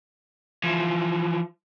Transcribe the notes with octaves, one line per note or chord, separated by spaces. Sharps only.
E3 F3